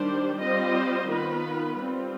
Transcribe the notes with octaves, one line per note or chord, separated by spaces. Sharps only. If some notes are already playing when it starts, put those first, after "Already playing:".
Already playing: D#3 G3 D4 G4 C5
G3 C4 F4 C5 D#5
D#3 B3 F4 B4
G3 C4 F4